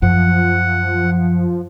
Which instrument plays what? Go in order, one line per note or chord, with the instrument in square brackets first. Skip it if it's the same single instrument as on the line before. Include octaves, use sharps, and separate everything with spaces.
[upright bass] F#2 [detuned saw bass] F3 [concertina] F#5